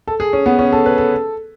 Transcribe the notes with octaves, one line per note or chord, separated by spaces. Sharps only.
A4
G#4
C#4
B3
C#4
A4
B4
A4